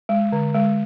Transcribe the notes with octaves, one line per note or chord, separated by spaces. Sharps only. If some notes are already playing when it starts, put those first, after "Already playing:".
G#3
D3
G#3